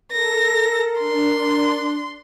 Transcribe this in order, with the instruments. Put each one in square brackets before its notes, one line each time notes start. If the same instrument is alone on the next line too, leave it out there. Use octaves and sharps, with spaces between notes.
[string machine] A4 [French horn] A#4 [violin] A#6
[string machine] D4 [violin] C6